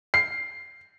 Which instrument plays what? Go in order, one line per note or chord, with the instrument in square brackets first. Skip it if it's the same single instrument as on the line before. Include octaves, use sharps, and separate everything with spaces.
[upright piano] C7